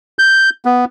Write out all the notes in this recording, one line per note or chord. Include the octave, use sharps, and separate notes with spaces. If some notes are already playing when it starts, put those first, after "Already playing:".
G6
B3